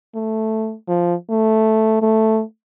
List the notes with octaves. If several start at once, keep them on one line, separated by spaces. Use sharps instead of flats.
A3
F3
A3
A3